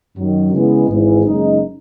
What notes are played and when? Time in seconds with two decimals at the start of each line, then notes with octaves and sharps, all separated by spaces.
0.15 F#2 D#3 F#3
0.51 C#3 E3 G#3 B3
0.88 G#1 G#2 E3
1.24 F#1 F#2 C#3 G#3 D#4